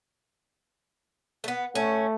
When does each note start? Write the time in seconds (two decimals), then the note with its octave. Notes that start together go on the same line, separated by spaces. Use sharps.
1.44 A3 B3
1.75 A3 C#4